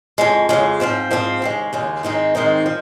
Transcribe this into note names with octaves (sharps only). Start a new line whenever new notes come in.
F2 C#3 G#3
F2 C#3 G#3
G#2 F3 C4 F4
G#2 F3 C4 F4
D#2 C#3 G#3
D#2 C#3 G#3
G#2 D#3 G#3 C4 D#4
G#2 D#3 G#3 C4 D#4
F3